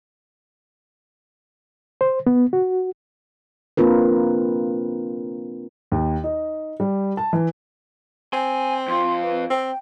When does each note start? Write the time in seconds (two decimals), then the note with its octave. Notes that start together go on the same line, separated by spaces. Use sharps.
2.01 C5
2.27 B3
2.53 F#4
3.77 A#3 C4 D4 F4 A#4 B4
5.92 D#2
6.24 D#4
6.80 G3
7.17 A5
7.33 E3
8.33 C4 G#5
8.88 F2 F4 C6
9.23 B4
9.50 C4 G5